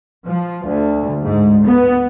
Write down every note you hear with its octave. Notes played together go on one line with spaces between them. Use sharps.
F3
D2
G#2
B3